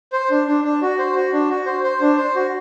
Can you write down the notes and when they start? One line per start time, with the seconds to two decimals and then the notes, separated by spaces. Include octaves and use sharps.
0.13 C5
0.31 D4
0.47 D4
0.64 D4
0.82 F#4
0.99 C5
1.15 F#4
1.33 D4
1.50 F#4
1.66 C5
1.84 C5
2.01 D4
2.17 C5
2.35 F#4